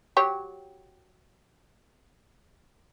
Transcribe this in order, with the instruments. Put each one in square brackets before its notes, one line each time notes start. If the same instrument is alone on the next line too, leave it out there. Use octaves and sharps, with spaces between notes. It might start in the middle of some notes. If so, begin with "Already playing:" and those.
[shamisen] F#3 G4 C#5